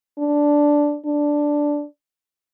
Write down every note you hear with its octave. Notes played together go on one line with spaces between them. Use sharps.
D4
D4